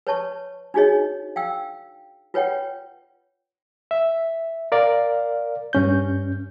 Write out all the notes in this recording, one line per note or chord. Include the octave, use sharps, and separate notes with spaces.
B4 C#5 A5 C#6
D4 D#4 F#4 G#4 C#5 D#5
F5 G5 E6
F4 B4 C#5 F#5 G5
E5
A#4 D5 F5
G2 C#4 G6